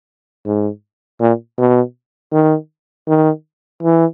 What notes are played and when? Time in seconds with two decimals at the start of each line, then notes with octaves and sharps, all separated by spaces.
0.46 G#2
1.20 A#2
1.58 B2
2.32 D#3
3.08 D#3
3.83 E3